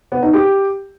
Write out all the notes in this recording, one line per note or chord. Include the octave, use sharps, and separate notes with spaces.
B3
D#4
G4